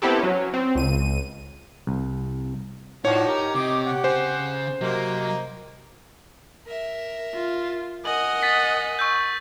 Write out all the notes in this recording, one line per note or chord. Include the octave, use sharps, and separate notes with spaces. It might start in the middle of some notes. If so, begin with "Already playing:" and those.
B3 C4 E4 G4 A4
F#3 C#4
C4
C#2 D#7
C2
A2 F3 D#4 F#4 C#5 D5
G4 A#4
C3 D#5 D6
F#5
C#3 C5 G#5
C3 F#3 A#3 D#5
A#4 E5
F4
A#4 D#5 F#5 G#5 F#7
A6 B6 D#7
C#6 E6 G6